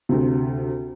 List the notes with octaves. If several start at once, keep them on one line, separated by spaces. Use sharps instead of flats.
D2 C3